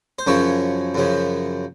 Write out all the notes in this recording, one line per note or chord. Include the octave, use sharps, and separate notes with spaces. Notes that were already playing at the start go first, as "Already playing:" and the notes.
C5
F#2 C#3 F3 C#5
F#2 C#3 F3